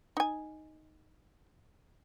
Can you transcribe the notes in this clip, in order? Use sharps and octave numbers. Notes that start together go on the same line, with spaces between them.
D#4 G#5